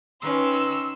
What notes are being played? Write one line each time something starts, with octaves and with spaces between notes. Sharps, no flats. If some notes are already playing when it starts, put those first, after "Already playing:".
D#3 C#4 B4 C6 E6